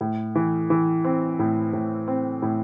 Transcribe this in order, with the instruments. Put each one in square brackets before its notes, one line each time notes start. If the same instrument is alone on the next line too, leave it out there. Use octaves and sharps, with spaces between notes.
[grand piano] A2
E3
E3
C4
A2
A2
C4
A2